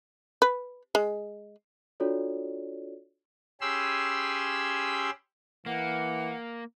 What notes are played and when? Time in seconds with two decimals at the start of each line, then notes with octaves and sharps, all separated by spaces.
0.42 B4
0.95 G#3
2.00 D4 F4 F#4 A4 C#5 D5
3.61 C#4 G4 G#4 B5 C6 E6
5.66 E3 A#3 F#5